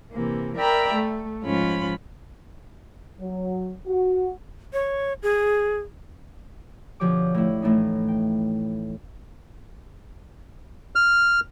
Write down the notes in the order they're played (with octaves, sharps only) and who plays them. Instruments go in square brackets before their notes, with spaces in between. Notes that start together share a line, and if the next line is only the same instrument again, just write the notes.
[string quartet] C3 E3 A#3
A#4 D5 E5 G5 A#5 B5
A3
G#2 F3 C#4 F4 B5
[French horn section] F#3
F#4
[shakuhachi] C#5
G#4
[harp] B2 D3 F3 G4 C#5 D6
A2 E4
A2 E3 A3 C#4 D#4
G5
[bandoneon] F6